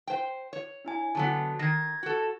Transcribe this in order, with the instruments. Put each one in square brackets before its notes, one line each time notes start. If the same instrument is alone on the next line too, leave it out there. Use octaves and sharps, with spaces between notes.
[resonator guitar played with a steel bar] C5 G5
C#5
[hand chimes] D4 E4 G#5
[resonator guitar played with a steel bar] D3 F#3 B3 [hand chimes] A5
[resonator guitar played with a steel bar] D#3 [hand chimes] G#6 A#6
[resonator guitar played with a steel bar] F#4 A4